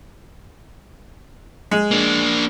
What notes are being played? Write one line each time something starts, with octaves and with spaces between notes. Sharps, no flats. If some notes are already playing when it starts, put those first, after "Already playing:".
G#3
A#3 D4